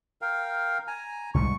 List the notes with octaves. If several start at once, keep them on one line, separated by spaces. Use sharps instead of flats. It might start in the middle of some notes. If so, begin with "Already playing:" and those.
A#4 F5 G5
G#5 A#5
C2 G#2 G3 C#6